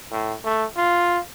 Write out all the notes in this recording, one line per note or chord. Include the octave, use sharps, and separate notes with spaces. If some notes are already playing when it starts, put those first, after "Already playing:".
A2
A3
F4